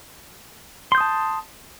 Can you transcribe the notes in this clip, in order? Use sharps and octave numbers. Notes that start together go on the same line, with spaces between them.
A5 C6 D#6 G6